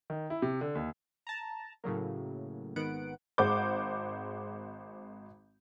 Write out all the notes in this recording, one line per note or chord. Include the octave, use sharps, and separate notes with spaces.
D#3
E4
C3
D3
D#2
A5 A#5
A2 C#3 F#3 A#3
G#1 D#3 B3 F#5 D7
G#1 G#3 C5 F#5 D6 G6